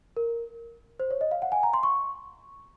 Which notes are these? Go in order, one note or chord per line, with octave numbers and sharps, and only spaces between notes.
A#4
C5
C#5
D#5
F5
F#5
G#5
A#5
C6
C#6